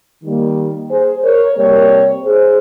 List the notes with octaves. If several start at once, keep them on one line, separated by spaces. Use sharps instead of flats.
D#3 G3 A#3
G#4 C5
A#4 C#5
C3 G3 A#3 A#4 C#5
G#4 C5